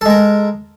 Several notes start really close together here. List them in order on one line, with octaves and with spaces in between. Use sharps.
A4 G#3 A#4